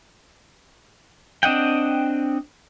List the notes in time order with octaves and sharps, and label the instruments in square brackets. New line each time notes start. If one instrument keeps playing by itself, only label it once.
[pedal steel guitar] C4 D4 D#5 F#5 G5